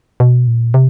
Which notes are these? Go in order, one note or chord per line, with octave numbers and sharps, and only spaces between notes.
B2
A#2
C3